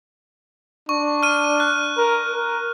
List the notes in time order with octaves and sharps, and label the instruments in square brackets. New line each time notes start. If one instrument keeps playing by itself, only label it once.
[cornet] D4 [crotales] C#6
[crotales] F6 D#7
F#6
[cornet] A#4
A#4